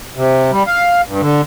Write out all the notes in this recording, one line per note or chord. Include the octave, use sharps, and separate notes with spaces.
C3
G3
F5
G2
D3